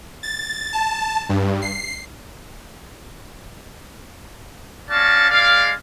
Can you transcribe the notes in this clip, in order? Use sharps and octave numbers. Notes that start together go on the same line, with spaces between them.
A6
A5
G2
C7
C#4 F#4 D5 F5 A5
G#3 D4 D5 F5